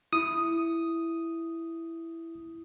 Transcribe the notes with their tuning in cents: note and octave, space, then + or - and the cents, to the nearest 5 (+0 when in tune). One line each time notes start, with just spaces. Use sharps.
E4 +5 D#6 +0